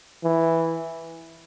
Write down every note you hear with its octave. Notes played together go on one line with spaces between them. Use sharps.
E3